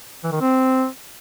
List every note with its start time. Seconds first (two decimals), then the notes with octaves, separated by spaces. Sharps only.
0.24 E3
0.32 D#3
0.41 C4